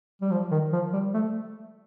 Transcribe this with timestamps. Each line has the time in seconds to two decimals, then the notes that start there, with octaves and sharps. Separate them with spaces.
0.22 G3
0.31 F3
0.51 D#3
0.73 F3
0.93 G3
1.14 A3